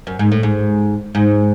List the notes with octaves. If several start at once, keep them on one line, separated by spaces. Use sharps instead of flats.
F#2
G#2
A2
G#2
G#2